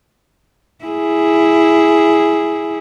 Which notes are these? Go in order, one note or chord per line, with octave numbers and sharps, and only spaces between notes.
E4 G#4